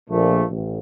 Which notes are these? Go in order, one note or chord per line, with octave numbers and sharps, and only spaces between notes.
A#1 A#2 F3 A3
A1